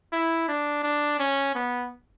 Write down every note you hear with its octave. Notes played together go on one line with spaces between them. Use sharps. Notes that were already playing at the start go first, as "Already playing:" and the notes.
E4
D4
D4
C#4
B3